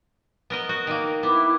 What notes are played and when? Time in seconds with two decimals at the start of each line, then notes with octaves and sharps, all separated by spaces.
0.50 B3 A#4 D#5
0.69 F#4
0.87 D#3 A#3
1.23 B3 E4 D6